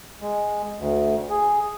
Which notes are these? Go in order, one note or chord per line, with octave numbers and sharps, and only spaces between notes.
G#3
D2
G#4